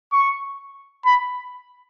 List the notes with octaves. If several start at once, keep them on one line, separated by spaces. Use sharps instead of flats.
C#6
B5